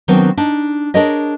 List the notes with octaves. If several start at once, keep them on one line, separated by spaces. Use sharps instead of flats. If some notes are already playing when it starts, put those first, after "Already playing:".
D#3 F#3 B3 C4 D4
D4 D#4
D4 G#4 A#4 C#5 D#5